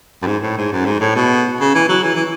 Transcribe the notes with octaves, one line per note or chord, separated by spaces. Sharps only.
F#2
G#2
A2
G#2
F#2
G#2
A2
B2
C#3
E3
F#3
E3
E3